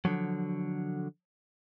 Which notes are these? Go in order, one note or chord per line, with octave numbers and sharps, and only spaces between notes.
D3 F3 F#3